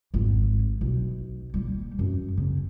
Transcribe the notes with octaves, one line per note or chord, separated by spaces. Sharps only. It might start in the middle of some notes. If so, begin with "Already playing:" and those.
G#1 F2
B1
G3 A#3
F#2
C#3